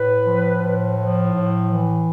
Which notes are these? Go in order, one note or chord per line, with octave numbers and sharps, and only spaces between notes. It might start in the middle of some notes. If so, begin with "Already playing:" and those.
Already playing: A2 B4
F3
A2
F3
A2
E3